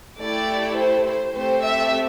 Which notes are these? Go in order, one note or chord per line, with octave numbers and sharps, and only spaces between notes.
A3 E4 G4 D5
C5
C5
A3 C4 G4 C5
E5